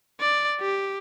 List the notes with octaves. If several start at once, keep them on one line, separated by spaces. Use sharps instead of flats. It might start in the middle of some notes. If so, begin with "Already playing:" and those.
D5
G4